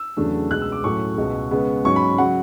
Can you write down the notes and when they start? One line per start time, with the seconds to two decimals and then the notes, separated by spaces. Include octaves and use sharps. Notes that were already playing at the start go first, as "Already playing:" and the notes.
Already playing: E6
0.17 E2 C#3 F#3 A3 D4
0.50 C#2 B2 G#3 F#6
0.61 E6
0.72 D6
0.84 A2 F#3 A3 C#4 E4 C#6
1.17 C#2 B2 G#3
1.51 C#3 G#3 B3
1.85 G#2 F#3 C#4 C#6
1.96 B5
2.18 C#3 F#3 F#5